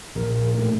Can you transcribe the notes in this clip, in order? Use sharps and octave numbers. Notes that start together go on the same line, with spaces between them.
A#1 A#4
A#4
A2 A3 A#4